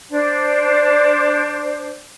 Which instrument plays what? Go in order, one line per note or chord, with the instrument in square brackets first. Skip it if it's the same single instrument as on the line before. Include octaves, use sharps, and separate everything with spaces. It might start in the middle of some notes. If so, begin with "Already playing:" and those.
[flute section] D4 C5